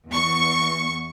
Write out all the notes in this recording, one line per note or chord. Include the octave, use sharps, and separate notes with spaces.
E2 C#6